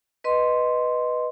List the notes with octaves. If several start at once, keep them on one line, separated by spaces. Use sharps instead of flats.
B4 D#5 C6